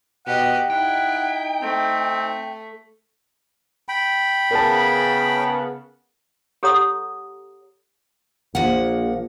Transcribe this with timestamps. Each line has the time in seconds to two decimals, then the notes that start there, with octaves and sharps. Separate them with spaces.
0.27 B2 G4 D#5 F#5
0.70 D#4 E4 F#5 G5
1.62 A3 C4
3.89 G5 B5
4.51 C#3 B3 A#4 A5
6.63 G4 A4 C#5 F#5 A#5 D#6
8.55 A#1 F3 A#3 F#5